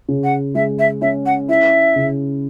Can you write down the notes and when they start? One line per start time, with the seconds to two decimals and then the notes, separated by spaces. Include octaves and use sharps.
0.08 C#3
0.23 F#5
0.55 G#3 E5
0.79 E5
1.02 C#4 E5
1.26 F#5
1.48 E4 E5
1.96 C#3